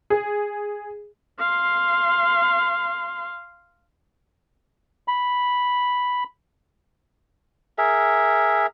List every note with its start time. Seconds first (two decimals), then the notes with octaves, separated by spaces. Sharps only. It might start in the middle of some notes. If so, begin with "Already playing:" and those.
0.10 G#4
1.39 F5 C6
5.08 B5
7.78 G#4 A#4 E5